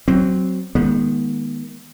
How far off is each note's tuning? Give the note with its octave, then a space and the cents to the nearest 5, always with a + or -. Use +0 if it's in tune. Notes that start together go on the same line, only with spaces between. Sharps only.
F#3 +15 C4 +0
D#3 +10 G#3 +0 B3 -35